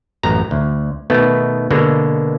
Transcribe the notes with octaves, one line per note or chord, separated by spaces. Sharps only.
A1 F#2 A#5
D2
B2 D#3 A3 B3
B2 D3 G#3 A#3